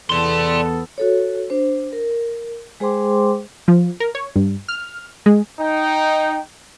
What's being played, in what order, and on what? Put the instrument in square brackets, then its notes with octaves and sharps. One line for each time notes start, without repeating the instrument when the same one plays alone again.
[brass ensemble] E2 B3 A4 [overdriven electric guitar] D5 C6
[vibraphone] F#4 A4 C#5
D4 C5
A#4
G#3 G#4 C5 G5 C6 D6
[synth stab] F3
A#4
C#5
G2
F6
G#3
[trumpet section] D#4 G5